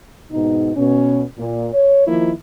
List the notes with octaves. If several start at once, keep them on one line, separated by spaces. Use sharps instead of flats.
G#2 B2 D#4
B2 C#4
A#2
C#5
D#3 F3 A#3 D#4 E4